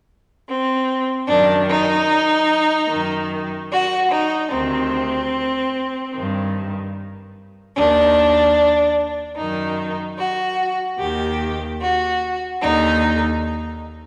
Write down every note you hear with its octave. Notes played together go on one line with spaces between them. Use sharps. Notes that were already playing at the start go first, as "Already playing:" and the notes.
C4
F#2 D#3 D4
D#4
F#2 D#3
F#4
D#4
D2 C3 D#3 C4
G2 D#3
D#2 D#3 D4
F#2 D#3 D#4
F#4
D#2 D#3 G4
F#4
D#2 D3 D#4